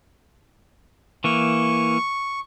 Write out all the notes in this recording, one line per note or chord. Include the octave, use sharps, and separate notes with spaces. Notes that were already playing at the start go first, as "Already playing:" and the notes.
E3 A#3 C#6